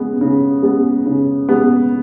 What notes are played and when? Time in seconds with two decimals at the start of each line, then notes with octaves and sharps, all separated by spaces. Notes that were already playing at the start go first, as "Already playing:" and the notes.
Already playing: C#3 G#3 B3
0.21 C#3
0.63 G#3 B3
1.06 C#3
1.49 G#3 B3